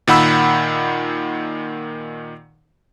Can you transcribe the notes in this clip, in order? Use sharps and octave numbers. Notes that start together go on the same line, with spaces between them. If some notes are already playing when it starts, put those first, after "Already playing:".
A#2 D#3 F#5 B5 E6